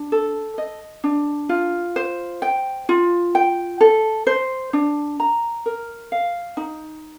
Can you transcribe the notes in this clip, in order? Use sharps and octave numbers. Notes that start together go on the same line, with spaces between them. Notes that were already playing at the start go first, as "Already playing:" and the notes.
Already playing: D4
A4
D#5
D4
F4
C5
G5
F4
G5
A4
C5
D4
A#5
A#4
F5
D#4